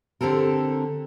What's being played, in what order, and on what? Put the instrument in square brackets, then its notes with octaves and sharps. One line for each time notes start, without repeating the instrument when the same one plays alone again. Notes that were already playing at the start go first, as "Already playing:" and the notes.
[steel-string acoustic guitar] D3 C4 G4 A4 A#4